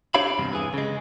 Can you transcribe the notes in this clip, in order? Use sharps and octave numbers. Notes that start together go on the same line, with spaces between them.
D4 G4 C#5 E5 F5 B5
E2 G2 C3
E3 G#4
C#3 G#3